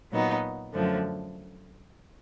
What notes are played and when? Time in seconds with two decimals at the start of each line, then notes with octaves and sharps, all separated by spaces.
0.11 A#2 F#3 B3 D#4
0.74 F#2 D3 F3 A3